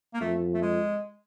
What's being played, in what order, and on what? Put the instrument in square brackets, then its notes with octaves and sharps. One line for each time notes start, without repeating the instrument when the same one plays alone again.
[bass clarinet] A#3
[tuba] F2 [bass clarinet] A3
[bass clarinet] A3
G#3